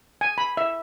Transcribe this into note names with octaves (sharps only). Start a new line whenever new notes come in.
G#5
B5
E5